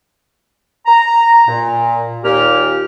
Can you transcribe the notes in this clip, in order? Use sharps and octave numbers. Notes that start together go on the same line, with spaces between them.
A#5
A#2
D#2 A#2 G4 F6